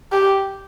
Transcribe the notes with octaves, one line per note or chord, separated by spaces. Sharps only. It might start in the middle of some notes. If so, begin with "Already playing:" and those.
G4